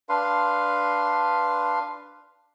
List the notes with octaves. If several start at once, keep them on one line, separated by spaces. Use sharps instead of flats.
D4 B4 F5 C6